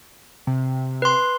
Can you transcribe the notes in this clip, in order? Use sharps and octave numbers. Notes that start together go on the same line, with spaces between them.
C3
B4 C6